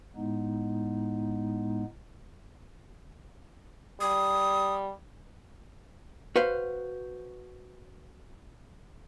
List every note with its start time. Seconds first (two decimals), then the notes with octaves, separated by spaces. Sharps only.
0.16 A2 G#3 B3 D#4
4.01 G3 D#6
6.36 F#4 B4 C5 F5